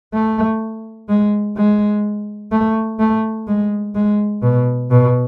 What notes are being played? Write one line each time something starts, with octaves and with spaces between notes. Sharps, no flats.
A3
G#3
G#3
A3
A3
G#3
G#3
B2
B2